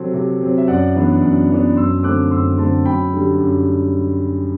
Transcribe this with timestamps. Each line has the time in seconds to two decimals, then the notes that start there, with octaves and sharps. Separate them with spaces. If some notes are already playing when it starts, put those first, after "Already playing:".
Already playing: C3 F#3 C4 A4
0.14 C3
0.41 F#3 C4
0.58 E5
0.67 F#2 D5 F#5
0.94 E3 B3 D4
1.21 F#2
1.50 E3 B3 D4
1.77 F#2 C6 E6
1.99 E6
2.03 D3 A3 C4 D6 F#6
2.31 F#2 C6 E6
2.58 D3 A3 C4 A5 C6
2.85 F#2 G5 B5
3.13 D3 G3
3.40 F#2